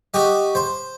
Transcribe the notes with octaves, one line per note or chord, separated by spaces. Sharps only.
F#4 G4 D#5
C5